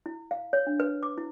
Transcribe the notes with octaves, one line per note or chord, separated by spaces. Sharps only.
E4
F5
C#5
D4
B4
D6
E4